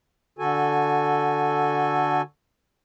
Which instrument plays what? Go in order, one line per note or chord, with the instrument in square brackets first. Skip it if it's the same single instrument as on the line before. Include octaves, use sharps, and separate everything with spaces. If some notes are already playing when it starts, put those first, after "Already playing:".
[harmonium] D3 F#4 A4 G#5